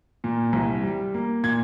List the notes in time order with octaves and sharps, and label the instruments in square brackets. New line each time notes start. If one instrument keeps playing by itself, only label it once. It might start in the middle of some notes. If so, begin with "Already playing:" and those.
[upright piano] A#2
C2
G3
A#3
A#2 G#6